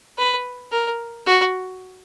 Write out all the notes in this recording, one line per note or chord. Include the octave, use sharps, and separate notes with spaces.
B4
A#4
F#4